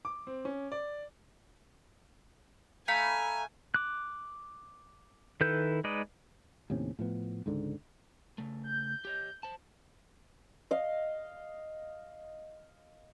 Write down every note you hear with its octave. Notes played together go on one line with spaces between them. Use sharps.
D6
C4
C#4
D5
A3 F5 G#5 A#5 B5
D6 F#6
D#3 E4 A4 B4 G6
G#3 D#4 B4 D5 D#5
D#2 A2 C3 C#4
A2 F3 B3
C#2 G#2 D3
C#3 A3
G6
G4 C#5 D#5
C5 A5
D#5 F5